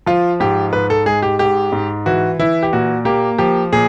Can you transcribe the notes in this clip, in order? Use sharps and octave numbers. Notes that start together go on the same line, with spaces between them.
F3 F4
G#2 G4
G#2 B4
A4
G#3 G#4
G4
G#2 G4
G#2
E3 F#4
E3 E4
G4
A#2 F#4
A#3 G4
F3 G4
A#2 G#4